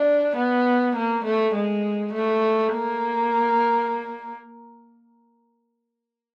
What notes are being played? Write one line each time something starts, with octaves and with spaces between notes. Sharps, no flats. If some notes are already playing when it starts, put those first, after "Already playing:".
Already playing: D4
B3
A#3
A3
G#3
A3
A#3